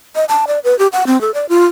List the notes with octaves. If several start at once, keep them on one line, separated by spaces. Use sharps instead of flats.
D#5
A5
D5
B4
G4
F#5
C4
A4
D5
F4